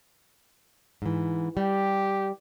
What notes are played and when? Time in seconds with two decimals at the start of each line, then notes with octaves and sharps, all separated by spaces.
1.02 G#2 E3
1.57 G3 G4